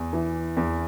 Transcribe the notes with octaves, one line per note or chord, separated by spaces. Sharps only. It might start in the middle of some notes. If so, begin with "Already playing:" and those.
Already playing: E2
E3
E2